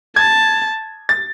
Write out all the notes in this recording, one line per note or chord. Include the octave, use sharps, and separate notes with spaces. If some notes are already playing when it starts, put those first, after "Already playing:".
A5 G#6
A6